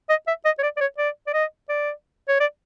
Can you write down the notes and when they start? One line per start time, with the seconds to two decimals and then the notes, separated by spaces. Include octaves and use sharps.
0.10 D#5
0.27 E5
0.45 D#5
0.59 C#5
0.63 D5
0.76 D5
0.80 C#5
0.98 D5
1.27 D5
1.33 D#5
1.69 D5
2.28 C#5
2.40 D5